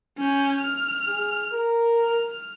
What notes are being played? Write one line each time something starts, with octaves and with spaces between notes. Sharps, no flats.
C#4 G6
F6
G#4
A#4
F6